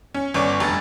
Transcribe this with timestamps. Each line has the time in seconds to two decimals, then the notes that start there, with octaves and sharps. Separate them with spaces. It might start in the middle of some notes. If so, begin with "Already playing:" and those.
0.14 C#4
0.34 G1 C#4 D5 C#6
0.60 F1 G2 A6